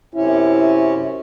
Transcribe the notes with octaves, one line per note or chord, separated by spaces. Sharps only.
F#2 C3 C#4 E4